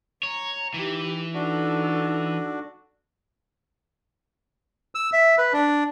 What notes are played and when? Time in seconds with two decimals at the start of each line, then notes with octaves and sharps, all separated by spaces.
0.23 C#5 A#5
0.74 E3 D#4 G4
1.34 D4 D#4 F#4 A4
4.95 E6
5.13 E5
5.38 B4
5.53 D4